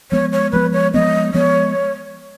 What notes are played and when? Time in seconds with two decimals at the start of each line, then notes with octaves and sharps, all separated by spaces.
0.11 F3 G#3 B3 C#5
0.33 C#5
0.52 F3 G#3 B3 B4
0.73 C#5
0.94 F3 G#3 B3 D#5
1.34 F3 G#3 B3 C#5